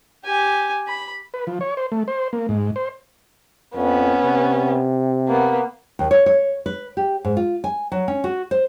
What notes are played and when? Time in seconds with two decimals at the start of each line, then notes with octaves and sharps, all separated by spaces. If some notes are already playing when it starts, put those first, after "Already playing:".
0.25 G4 G#5
0.87 B5
1.34 B4
1.47 F3
1.61 C#5
1.77 C5
1.92 A3
2.08 C5
2.33 A#3
2.49 G#2
2.76 C5
3.76 F2 B3 C#4
4.24 C3
5.28 A#3 B3
5.99 D#2
6.11 C#5
6.26 C#5
6.66 B4
6.97 G4
7.24 G#2
7.37 F4
7.64 G#5
7.92 F#3
8.08 C#4
8.24 F#4
8.51 C5